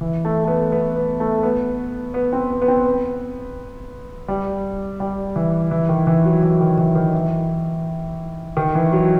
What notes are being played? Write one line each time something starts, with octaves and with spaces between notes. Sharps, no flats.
E3
A3
A3
B3
B3
B3
A3
B3
B3
C4
B3
B3
C4
B3
G3
G3
E3
E3
D#3
E3
F#3
E3
D#3
E3
D#3
E3
D#3
E3
F#3